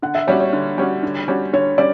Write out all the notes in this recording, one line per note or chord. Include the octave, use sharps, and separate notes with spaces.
D3 F#5
E5
G3 C#4 F#4 C#5
C#5
D3
G3 C#4 F#4
D3
G3 C#4 F#4
D3 C#5
G3 C#4 D5